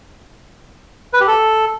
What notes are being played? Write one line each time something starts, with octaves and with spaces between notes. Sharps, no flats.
B4
G4
A4